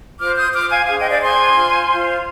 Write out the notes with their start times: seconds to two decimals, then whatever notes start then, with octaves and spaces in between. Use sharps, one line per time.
0.19 F4 C5 D6 F6
0.36 D#6 G6
0.53 F4 C5 D6 F6
0.71 F5 G#5
0.87 D4 G#4 C5 F5 G#5
0.99 D#5 G5
1.10 D5 F5
1.21 D4 G#4 C5 G#5 C6
1.55 F4 C5
1.89 F4 C5